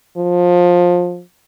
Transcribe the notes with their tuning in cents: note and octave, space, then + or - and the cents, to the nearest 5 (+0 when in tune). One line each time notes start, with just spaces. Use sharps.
F3 +20